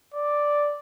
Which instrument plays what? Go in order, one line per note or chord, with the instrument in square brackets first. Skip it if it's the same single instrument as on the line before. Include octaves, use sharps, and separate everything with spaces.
[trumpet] D5